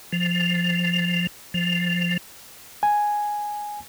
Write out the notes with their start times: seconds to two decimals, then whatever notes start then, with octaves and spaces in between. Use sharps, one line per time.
0.12 F3
1.54 F3
2.83 G#5